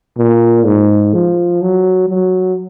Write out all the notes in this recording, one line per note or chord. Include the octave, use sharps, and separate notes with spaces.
A#2
G#2
F3
F#3
F#3